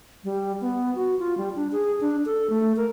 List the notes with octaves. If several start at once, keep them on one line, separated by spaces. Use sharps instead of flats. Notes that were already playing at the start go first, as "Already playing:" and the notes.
G3
B3
F#4
F4
G3
D4
G#4
D4
A4
A3
A#4